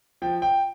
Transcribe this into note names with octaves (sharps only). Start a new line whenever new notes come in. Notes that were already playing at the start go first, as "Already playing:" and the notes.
F3 G5
G5